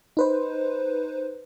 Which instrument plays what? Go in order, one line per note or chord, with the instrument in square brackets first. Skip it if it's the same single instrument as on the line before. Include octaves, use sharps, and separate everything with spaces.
[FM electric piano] D#4 B4 C5